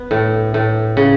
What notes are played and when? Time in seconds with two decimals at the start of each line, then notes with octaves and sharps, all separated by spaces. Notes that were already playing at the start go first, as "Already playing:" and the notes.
Already playing: B3
0.11 A2
0.54 A2
0.97 C#3